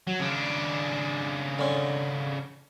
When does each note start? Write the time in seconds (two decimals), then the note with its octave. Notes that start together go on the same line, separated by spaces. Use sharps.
0.07 F#3
0.20 C#3 D4
1.59 D3 C#4